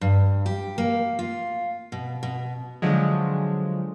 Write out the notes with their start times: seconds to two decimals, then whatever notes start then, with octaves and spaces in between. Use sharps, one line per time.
0.01 G2
0.46 G4
0.78 A#3
1.19 F4
1.92 B2
2.23 B2
2.82 D3 F3 F#3 G#3